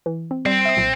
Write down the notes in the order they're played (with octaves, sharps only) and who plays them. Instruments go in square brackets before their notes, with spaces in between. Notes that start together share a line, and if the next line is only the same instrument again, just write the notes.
[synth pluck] E3
C4
[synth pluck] G3 [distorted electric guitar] C4
[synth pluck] E5 D#6
B1 A#2 G5